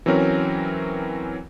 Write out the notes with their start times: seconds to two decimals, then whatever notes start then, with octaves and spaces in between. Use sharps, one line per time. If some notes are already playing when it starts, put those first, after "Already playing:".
0.06 E3 F#3 C4 C#4 A#4